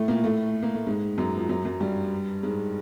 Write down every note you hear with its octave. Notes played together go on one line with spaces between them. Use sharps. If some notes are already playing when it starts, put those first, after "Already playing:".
Already playing: A2 A3
A#2 A#3
A2 A3
A#3
A3
G#2 G#3
F#2 F#3
F3
F#2 F#3
F#2 F#3
G2 G3
G#2 G#3